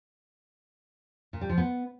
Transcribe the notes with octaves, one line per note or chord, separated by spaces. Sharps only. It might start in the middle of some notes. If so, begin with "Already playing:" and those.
A#2
G3
F3
B3